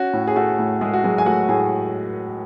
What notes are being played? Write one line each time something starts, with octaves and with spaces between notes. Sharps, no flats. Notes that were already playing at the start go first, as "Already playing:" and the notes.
Already playing: C#4 F#4
A2
G#4
A3 F#4
A2
G#3 A3 G#4
F#4
F#3 G#3 G#4
G#5
A3 F#4 F#5
A2 G#4 G#5